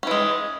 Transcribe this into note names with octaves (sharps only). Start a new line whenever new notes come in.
E3 G#3 C#4